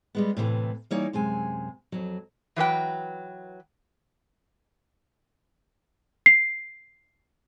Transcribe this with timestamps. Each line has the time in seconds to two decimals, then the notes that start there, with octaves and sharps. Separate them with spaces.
0.15 G3 G#3 B3
0.37 A2 C3 E3 B3
0.91 E3 G3 A#3 D#4 C#5
1.13 F#2 C3 G#3 G#5
1.92 F2 F#3
2.56 E3 F#3 B4 G5
6.26 C7